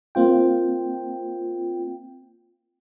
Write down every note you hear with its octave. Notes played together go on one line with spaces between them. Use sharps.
A#3 C4 F4 G5